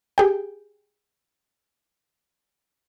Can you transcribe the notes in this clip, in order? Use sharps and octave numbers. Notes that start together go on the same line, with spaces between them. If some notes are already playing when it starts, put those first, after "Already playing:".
G4 G#4 G5